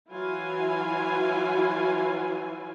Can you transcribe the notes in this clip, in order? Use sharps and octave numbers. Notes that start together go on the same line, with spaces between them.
E3 F#3 E4 F4 G#5